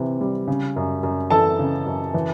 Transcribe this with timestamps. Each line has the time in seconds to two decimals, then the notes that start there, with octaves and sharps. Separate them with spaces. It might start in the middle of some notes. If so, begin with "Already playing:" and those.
Already playing: C3 E3
0.21 G3
0.47 C#3
0.76 F#2
1.03 F#2
1.30 E3 A4 A5
1.59 C#3
1.86 F#2
2.14 E3